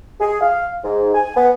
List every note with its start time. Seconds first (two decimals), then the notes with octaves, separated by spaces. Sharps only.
0.20 G#4
0.41 F5
0.84 G#2
1.14 G#5
1.36 B3